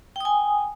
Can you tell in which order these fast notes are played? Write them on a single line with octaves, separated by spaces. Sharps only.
G5 D#6 G#5